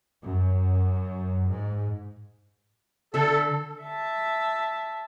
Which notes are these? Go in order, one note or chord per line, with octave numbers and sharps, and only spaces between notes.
F#2
G#2
D3 A4 E5
E5 A5